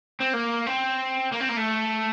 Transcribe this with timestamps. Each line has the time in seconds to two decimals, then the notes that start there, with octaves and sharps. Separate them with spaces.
0.20 C4
0.33 A#3
0.66 C4
1.32 A#3
1.40 C4
1.49 A#3
1.57 A3